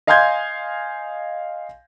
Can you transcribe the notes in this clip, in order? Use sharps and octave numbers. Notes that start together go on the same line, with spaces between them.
D#5 F5 G#5 C6 G6 G#6